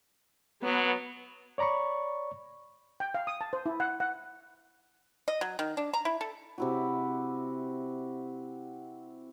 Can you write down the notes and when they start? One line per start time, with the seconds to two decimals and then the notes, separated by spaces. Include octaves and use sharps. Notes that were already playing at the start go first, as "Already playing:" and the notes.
0.63 F#3 B3
1.58 C#5 D5 A#5 B5 C#6
3.00 G5
3.14 F5
3.27 D#6
3.41 A5
3.53 C5
3.66 E4
3.80 F#5
4.00 F#5
5.28 D#5
5.41 F#3
5.59 D#3
5.77 D4
5.93 A#5
6.05 E4
6.21 A4
6.58 C3 E4 F#4